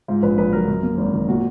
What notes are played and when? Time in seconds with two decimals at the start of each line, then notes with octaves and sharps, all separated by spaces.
0.08 G#2 F4
0.23 A#1 B4
0.38 A#1 B4
0.53 F#3 A#4
0.68 F#2
0.83 A#3
0.98 G#1
1.13 D#3
1.28 A#2 F#4